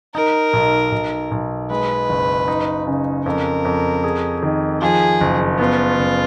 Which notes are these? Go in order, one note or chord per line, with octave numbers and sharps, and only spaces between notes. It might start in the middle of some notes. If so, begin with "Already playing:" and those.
D#4 A#4
B1
B1
B1
G#3 B4
F#1
D#4
C#3
F2 A#4
F2
G#4
D#3
F3 G#4
F#1
B3 F4
F#1